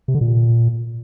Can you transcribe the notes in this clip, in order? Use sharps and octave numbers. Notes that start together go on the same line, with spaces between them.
C3
D3
A#2